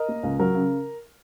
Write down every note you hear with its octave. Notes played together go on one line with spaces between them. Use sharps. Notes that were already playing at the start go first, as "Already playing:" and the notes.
Already playing: A#4 D#5
A#3
C#2
F#3 A#4
C#3